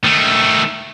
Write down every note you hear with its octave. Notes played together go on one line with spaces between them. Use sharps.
D#3 A3